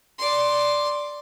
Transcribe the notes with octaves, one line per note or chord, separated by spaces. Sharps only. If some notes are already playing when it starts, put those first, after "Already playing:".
D5 C6